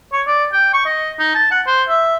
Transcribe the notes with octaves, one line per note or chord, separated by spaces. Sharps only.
C#5
D5
G5
C#6
D#5
D#4
A5
F#5
C5
E5